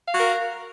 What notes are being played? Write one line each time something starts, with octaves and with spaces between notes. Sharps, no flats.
F#4 A#4 F5